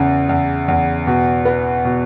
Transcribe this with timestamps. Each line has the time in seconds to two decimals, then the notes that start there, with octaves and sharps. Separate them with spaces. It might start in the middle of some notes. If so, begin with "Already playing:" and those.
Already playing: E2 C#3
0.29 E2
0.68 E2
1.07 B2
1.45 B3
1.85 B2